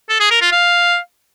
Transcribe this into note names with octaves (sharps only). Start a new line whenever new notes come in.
A4
G#4
A#4
F4
F5